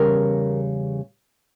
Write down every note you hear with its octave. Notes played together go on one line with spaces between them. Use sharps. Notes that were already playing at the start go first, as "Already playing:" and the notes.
Already playing: E2 C#3 G3 A#4